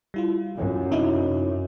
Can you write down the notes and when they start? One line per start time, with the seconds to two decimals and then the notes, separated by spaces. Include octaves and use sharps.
0.14 G3 E4 F4
0.58 F#2
0.91 C3 D#4 E4